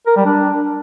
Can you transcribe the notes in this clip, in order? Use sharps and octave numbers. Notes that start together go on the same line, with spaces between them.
A#4
G3
D4